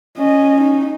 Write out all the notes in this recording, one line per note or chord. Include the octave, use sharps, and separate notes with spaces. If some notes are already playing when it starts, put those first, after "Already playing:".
C#4 D#5
D#4